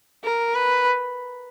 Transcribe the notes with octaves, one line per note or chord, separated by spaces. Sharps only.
A#4
B4